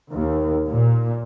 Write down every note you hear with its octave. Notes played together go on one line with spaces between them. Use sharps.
D#2
A#2